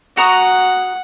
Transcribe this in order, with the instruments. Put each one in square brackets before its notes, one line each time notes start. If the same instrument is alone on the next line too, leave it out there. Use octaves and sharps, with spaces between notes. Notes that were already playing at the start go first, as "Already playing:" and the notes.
[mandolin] F#4 A#5 D#6 [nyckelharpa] F#5